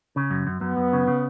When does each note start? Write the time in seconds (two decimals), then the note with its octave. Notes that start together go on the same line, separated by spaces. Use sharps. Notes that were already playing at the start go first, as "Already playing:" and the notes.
0.16 C#3
0.30 F#2
0.47 F#2
0.61 F#2 B3
0.77 F#2
0.93 C#3
1.07 C#3